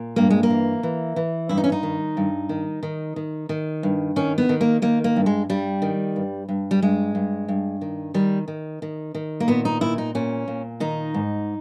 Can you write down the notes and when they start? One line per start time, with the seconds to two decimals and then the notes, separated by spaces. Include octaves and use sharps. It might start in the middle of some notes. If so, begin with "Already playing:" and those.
Already playing: A#2
0.16 G2 A#3
0.30 G#3
0.43 A#3
0.50 E3
0.83 E3
1.16 E3
1.49 G2 E4
1.58 D#4
1.64 C#4
1.72 D#4
1.83 D#3
2.17 G2
2.49 D#3
2.83 D#3
3.16 D#3
3.49 D#3
3.83 G2
4.16 D#3 C#4
4.38 B3
4.49 D#3
4.61 A#3
4.82 D#3 A#3
5.04 A#3
5.16 G2
5.26 G#3
5.49 G2 G3
5.82 D#3
6.16 G2
6.49 G2
6.71 G3
6.82 G2 G#3
7.15 G2
7.48 G2
7.81 D#3
8.14 D#3 G3
8.48 D#3
8.82 D#3
9.15 D#3
9.40 A#3
9.48 A#2 B3
9.65 D#4
9.81 A#2 E4
9.98 D#4
10.15 A#2 C#4
10.48 A#2
10.80 D#3 D#4
11.14 G#2